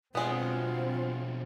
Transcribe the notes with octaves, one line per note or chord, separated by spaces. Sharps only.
B2 F#3 G#3 B3 C4 D4 F4